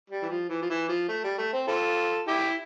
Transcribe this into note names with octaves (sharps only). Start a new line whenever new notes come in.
G3
E3
F3
E3
F3
E3
F3
A3
G3
A3
C4
F4 A4
E4 G4